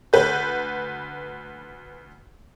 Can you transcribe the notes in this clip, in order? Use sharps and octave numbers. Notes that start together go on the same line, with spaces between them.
D2 B4 G6